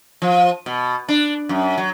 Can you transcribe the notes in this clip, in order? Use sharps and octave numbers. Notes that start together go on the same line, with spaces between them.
F3
B2
D4
F#2
F#3